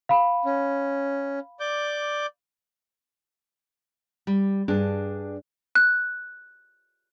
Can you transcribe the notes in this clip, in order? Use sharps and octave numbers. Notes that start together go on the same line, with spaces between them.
F5 B5
C#4
D5 D6 G6
G3
G2 D4 G#4
F#6